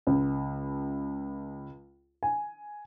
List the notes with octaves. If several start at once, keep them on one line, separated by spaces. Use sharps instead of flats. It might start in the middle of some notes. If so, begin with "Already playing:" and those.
C#2
G#5